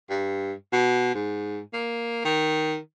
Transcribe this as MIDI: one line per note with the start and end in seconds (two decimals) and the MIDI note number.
0.10 0.53 43
0.72 1.14 47
1.15 1.60 44
1.73 2.22 58
2.25 2.77 51